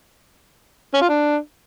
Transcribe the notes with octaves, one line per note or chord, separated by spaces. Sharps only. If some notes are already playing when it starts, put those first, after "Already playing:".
C#4
F4
D4